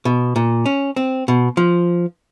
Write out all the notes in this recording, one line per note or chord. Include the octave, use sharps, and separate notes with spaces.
B2
A#2
C#4
C4
B2
F3